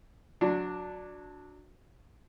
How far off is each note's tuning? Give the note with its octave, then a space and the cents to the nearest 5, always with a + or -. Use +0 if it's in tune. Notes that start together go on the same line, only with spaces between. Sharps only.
F#3 -20 D4 +0